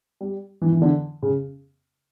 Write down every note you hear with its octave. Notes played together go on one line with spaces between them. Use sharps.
G3
E3
E3
D3
C#3